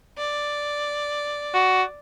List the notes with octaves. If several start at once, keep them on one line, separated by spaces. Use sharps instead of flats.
D5
F#4